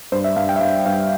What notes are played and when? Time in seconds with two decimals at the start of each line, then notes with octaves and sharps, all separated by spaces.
0.12 G2 C5
0.24 E5
0.36 G2 F5
0.49 G5
0.56 E5
0.61 G2 F5
0.86 G2 F5